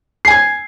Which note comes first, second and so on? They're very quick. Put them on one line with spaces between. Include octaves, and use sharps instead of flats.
C7 G#5 G#6